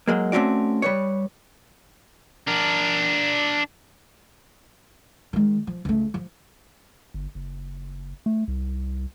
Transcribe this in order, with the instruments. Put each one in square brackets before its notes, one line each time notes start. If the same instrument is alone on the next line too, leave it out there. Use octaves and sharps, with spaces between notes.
[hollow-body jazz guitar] F#3 G#3 A#3
A3 C4 C#4 F#4 D5
G3 B4 C#5
[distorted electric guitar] D4 A#4
[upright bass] D#3 G#3
F3
C#2 A3
F3
[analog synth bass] G1
F#1
A3
C2